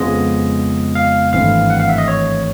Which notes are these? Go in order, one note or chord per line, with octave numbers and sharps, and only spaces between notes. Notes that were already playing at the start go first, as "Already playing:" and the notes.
Already playing: F2 C#3 F3 G#3 B3 D#5
F5
G#1 G2 E3 A3 C4 F5
F#5
F5
E5
D#5
C#5